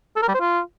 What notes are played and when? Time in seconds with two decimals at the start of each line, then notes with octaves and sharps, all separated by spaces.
0.16 A4
0.22 A#4
0.28 G3
0.34 C5
0.40 F4